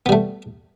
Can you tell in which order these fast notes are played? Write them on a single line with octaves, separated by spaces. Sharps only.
B3 G3 A3